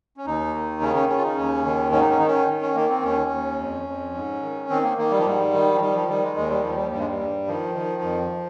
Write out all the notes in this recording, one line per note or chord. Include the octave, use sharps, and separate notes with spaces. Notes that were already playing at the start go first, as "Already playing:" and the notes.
C#4
D#2 D#4
D#3
C#3 C#4
C#4
C#3 C#4
F4
D#4
D#2 C#4
D#3
G#2 C#4
D#4
C#4
D#3 D#4
C#4
D#3
C#4
D#3 A#3
C4
D#2 C#4
D#2
F2
F2
G#2
D#3
D#3 C4
A#3
D#3 A#3
G3
F3
G#2 G3
D#3
F3
D#3 G3
F3
D#3 G3
G#3
D#2 G#3
G3
D#2 F3
G3
G2 G3
G#3
G3
G2
D#3 F3
D#3
F2